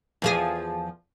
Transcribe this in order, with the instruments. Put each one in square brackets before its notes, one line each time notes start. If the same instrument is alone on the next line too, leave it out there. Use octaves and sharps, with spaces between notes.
[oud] E2 F3 G#4